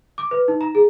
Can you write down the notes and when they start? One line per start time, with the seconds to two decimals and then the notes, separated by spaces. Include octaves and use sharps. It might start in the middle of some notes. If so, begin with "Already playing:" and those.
0.18 D6
0.31 B4
0.48 D#4
0.61 A#5
0.75 G#4